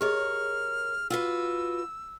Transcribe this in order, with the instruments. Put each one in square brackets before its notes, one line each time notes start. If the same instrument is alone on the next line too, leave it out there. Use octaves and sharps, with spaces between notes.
[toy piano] G4 G#4 D#5 [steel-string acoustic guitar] A#4 C#5 [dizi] F6
[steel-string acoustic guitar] F4 F#4 B4 [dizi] E6